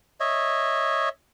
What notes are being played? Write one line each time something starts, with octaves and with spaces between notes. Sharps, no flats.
C#5 D#5 E5